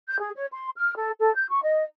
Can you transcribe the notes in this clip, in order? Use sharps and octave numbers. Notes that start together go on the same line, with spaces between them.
G6
G#4
C#5
C6
F6
A4
A4
G6
C#6
D#5